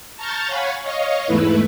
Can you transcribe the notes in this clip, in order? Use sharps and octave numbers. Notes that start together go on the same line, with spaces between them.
A5 A#5 C#6 F6 G6 A6
C#5 F5 F#5 G#5 B5 C#6
C#5 D#5 F5 C#6
E2 G#2 A3 E4 B4